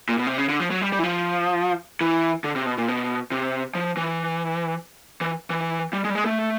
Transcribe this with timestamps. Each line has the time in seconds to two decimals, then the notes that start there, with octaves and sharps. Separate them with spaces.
0.09 A#2
0.18 B2
0.27 C3
0.38 C#3
0.49 D3
0.60 F3
0.71 F#3
0.82 G3
0.92 G3
0.99 E3
1.04 F3
2.01 E3
2.44 D3
2.56 C3
2.66 B2
2.78 A#2
2.88 B2
3.32 C3
3.75 F3
3.97 E3
5.21 E3
5.50 E3
5.93 G3
6.04 G#3
6.10 G3
6.15 G#3
6.25 A3